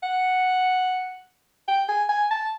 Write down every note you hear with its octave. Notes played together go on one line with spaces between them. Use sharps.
F#5
G5
G#5
G#5
A5